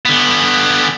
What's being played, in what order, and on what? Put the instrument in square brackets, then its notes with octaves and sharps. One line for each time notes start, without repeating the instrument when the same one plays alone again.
[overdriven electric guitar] D3 B3